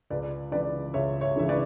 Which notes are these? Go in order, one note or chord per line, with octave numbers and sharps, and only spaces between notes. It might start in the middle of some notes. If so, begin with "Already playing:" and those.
C#2 B4 D5
C#3 E3 B4 D5
C#2 C#5 E5
C#5 E5
C#3 E3 E5
B4 D5